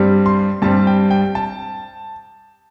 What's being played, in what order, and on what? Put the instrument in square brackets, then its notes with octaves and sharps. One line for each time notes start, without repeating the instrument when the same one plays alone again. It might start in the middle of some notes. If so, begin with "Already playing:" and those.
Already playing: [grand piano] G2 G3 C4
C6
G2 G3 C4 A5
G5
G5
A5